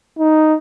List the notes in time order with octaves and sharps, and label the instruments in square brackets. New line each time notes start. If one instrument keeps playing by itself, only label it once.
[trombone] D#4